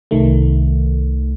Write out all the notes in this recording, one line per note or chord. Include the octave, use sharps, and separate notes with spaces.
C2 D#3 A3